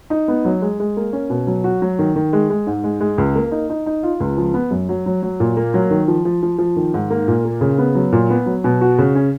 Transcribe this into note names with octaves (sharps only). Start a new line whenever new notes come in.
D#4
B3
F#3
G#3
G#3
A#3
C#4
B2
F#3
F#4
F#3
D#3
D#3
G#3
G#3
G#2
G#3
G#3
C#2
A#3
D#4
D#4
D#4
F4
C#2
F3
B3
F#2
F#3
F#3
F#3
A#2
A#3
F#3
D#3
F3
F3
F3
F3
D#3
G#2
A#3
A#2
A#3
C#3
B3
F#3
A#2
B3
F#3
B2
F#4
C#3
C#4